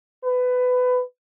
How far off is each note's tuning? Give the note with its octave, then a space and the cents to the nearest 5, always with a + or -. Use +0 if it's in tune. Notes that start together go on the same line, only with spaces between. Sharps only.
B4 +20